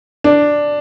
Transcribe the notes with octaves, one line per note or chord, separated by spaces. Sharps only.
D4